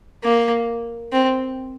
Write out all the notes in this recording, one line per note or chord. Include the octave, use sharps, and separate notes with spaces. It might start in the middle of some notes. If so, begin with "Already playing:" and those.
A#3
C4